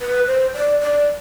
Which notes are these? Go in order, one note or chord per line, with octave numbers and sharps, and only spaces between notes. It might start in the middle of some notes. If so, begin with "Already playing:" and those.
B4
C5
D5
D5